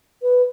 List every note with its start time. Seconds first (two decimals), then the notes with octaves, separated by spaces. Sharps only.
0.23 B4